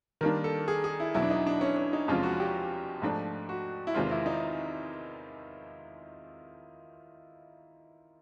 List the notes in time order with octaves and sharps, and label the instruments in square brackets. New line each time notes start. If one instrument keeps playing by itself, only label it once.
[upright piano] D#3 G3 A#3 D4 [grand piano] A#4
[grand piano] A4
G#4
G#4
E4
[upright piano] E2 B2 F#3 [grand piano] E4
[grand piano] D4
D#4
D4
C#4
C#4
D#4
[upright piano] E2 C3 F3 G#3 C#4 [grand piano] F4
[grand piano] F#4
G4
[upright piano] G#2 F3 A3 D4
[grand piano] F#4
E4
[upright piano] E2 C3 D#3 G#3 C4 [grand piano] F4
[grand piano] E4
D#4